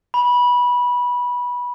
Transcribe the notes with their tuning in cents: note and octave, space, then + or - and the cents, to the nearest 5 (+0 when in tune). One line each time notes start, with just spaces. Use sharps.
B5 -20